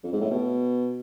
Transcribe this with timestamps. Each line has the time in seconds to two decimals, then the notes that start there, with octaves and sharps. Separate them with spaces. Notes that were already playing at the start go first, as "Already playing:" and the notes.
0.04 F2
0.13 G#2
0.21 A2
0.31 B2